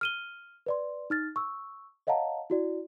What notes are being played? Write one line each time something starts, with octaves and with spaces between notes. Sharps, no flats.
F6 D#7 G7
B4 D5 C6
D#4 F6 A6
C#6 E6
C#5 D#5 F5 F#5 A5 A#5
E4 F#4 D5